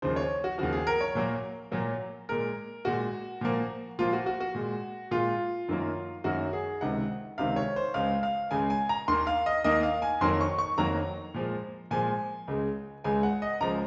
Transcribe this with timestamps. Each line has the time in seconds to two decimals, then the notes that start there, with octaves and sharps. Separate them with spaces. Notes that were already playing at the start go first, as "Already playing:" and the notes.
0.02 D#2 C#3 F3 C5
0.16 C#5
0.44 F#4
0.58 D#2 C#3 F3 F#4
0.73 G#4
0.87 A#4
1.01 C#5
1.15 A#2 F#3 A#3
1.71 A#2 F#3 A#3
2.29 A#2 G#3 A#4
2.85 A#2 G#3 F#4
3.41 A#2 F3 A#3
3.99 A#2 F3 A#3 F4
4.13 F#4
4.26 F#4
4.41 F#4
4.55 A#2 G#3
5.11 A#2 G#3 F4
5.68 F#2 D#3 F#3 A#3
6.24 F#2 D#3 F#3 A#3 F#4
6.53 G#4
6.81 C#2 C3 D#3 F#5
7.38 C#2 C3 D#3 F5
7.56 C#5
7.76 C5
7.94 C#2 C#3 G#3 F5
8.23 F5
8.51 C#2 C#3 G#3 G#5
8.70 G#5
8.89 A#5
9.08 D#2 D#3 A#3 C6
9.27 F5
9.46 D#5
9.64 D#2 D#3 A#3 D#5
9.83 F5
10.02 G#5
10.21 F2 D#3 F#3 A#3 C6
10.41 C#6
10.59 C#6
10.78 F2 D#3 F#3 A#3 A#5
11.34 A#2 F3 G#3
11.91 A#2 F3 G#3 G#5
12.48 C#2 C#3 G#3
13.04 C#2 C#3 G#3 G#5
13.23 F#5
13.42 D#5
13.60 C#2 C#3 F3 G#3 A#5